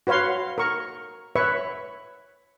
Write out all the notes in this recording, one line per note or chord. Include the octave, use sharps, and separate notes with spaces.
F#4 B4 C#5 F5 C6
A#4 C#6
B4 C#5 E5 C#6